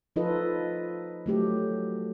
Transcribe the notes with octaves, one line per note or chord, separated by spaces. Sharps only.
F3 D#4 F4 A4 B4 D#5
F#3 A3 G4